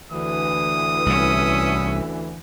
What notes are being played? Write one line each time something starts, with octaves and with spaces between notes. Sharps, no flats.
D2 D3 E3 D#6
C2 C#4 E5